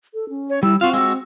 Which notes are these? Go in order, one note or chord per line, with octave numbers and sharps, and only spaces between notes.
A4
C#4
C#5
G3 E4 E6
C4 F4 F#4 F5
G#3 F#4 E6